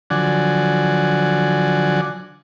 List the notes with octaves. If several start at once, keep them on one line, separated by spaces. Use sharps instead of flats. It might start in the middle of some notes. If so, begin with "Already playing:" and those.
D3 F3 F#3 D5 F#5 G#5